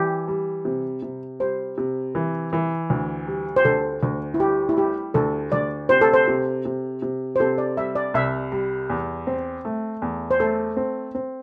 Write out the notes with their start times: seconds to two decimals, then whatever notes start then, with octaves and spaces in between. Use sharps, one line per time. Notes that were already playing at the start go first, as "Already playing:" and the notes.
Already playing: E3 G4
0.28 G3
0.65 C3
1.02 C3
1.40 G3 C5
1.78 C3
2.15 E3
2.53 E3
2.90 D2
3.27 G3
3.56 C5
3.65 D2 A4
4.03 D2
4.34 E4
4.40 G3 G4
4.69 E4
4.77 G3 G4
5.14 D2 A4
5.52 D2 D5
5.89 C3 C5
6.01 A4
6.14 C5
6.27 C3
6.65 C3
7.02 C3
7.36 C5
7.40 C3 A4
7.58 D5
7.77 G3 E5
7.96 D5
8.14 C2 E5
8.52 G3
8.90 E2
9.27 C4
9.65 A3
10.02 E2
10.31 C5
10.40 A3 A4
10.77 C4
11.15 C4